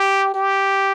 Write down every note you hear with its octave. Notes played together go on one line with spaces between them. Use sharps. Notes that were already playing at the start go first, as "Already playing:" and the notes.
Already playing: G4
G4